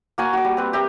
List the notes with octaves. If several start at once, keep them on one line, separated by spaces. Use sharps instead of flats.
A#3 F#4 G#5 A5
F#4 D6
G3
C4 B4
G4 A#4 E5